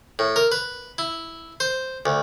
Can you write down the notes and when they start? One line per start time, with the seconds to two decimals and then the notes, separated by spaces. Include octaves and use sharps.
0.19 A2
0.36 A#4
0.52 B4
0.98 E4
1.60 C5
2.06 D2